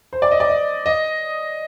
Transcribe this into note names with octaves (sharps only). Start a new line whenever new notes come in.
C5
D5
D#5
D5
D#5
D#5